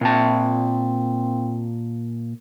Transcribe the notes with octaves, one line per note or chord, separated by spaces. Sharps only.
A#2 C4 A5